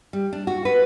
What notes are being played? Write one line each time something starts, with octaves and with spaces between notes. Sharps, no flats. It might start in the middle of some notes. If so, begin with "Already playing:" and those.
G3
D4
F#4
B4